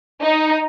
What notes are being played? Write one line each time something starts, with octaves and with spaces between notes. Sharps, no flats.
D#4